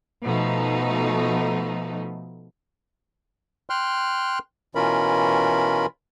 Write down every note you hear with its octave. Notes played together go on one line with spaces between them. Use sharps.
B2 F3 A3 D#4
G5 C6 F6 F#6
B2 E3 C#4 F4 A#4 B5